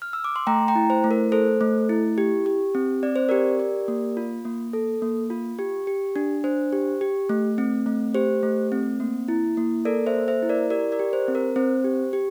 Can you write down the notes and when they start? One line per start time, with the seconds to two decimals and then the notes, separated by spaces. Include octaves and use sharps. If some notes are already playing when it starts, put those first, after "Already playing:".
0.02 F6
0.13 E6
0.24 D6
0.36 C6
0.47 A3 G5 A#5
0.68 G5 A#5
0.76 E4
0.90 C5
1.04 A3
1.11 A#4
1.32 A4 C5
1.61 A3
1.89 E4
2.18 G4
2.46 G4
2.75 C4
3.03 C4 D5
3.16 C5
3.29 G4 A#4 D5
3.60 G4
3.88 A#3
4.17 F4
4.45 A#3
4.73 A4
5.02 A#3
5.30 F4
5.59 G4
5.87 G4
6.16 D4
6.44 D4 C5
6.73 G4
7.01 G4
7.29 A3
7.58 C4
7.86 A3
8.14 G4 C5
8.43 A3
8.72 C4
9.00 A#3
9.28 E4
9.57 A#3
9.85 A4 A#4 D5
10.07 C5 E5
10.14 A#3
10.28 C5 E5
10.43 E4
10.49 A#4 D5
10.70 G4 A#4 D5
10.92 A#4 D5
10.99 G4
11.13 C5
11.28 C4
11.35 A#4
11.56 C4 C5
11.84 G4
12.13 G4